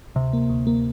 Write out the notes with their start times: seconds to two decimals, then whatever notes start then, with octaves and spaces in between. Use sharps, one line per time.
0.15 D2 C3
0.33 A#3
0.50 D2
0.67 A#3